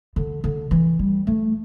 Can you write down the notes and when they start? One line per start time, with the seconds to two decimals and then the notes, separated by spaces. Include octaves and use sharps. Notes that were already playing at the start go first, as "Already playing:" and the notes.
0.16 D3
0.44 D3
0.71 E3
0.99 G3
1.27 A3